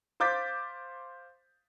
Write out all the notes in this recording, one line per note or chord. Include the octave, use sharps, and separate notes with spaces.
C5 F5 D6 G6 A6 B6